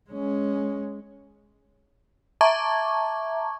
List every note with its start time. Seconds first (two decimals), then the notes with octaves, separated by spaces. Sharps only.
0.10 G#3 C#4
2.41 E5 A5 A#5 C#6 D6 G#6